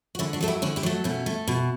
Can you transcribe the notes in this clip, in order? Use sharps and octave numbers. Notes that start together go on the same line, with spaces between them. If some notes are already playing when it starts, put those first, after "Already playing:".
F#4
D3 C#4 E4
D4 F#4
F#3 A3 A4
E4 G4
D3 C#4 E4
E4 G4
F#3 A3
B2 A3 C#4
A3
B2